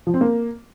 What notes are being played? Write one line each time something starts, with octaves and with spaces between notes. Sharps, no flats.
F3
C4
A#3